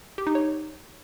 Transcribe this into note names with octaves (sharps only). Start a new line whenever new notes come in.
G4
D#4
C#5